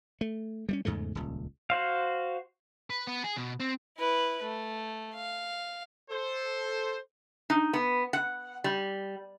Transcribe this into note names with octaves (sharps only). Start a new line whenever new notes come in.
A3
G3 G#3 C#4
E2 G#2 C#3 A3
D#1 C#2
F#4 C5 F5
B4
B3
G#4
B2
C4
E4 B4
A3
F5
A4 C5
D#4
B3
F#5
G3